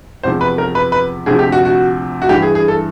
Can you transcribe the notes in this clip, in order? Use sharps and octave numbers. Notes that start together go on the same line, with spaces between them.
E2 C3 F3 C5
B4
A#4
B4
B4
D2 C3 F3 G#4
G4
F#4
F#4
F#4
G2 E3 G4
G#4
G#4
A4